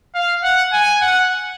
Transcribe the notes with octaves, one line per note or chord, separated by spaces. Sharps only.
F5
F#5
G#5
F#5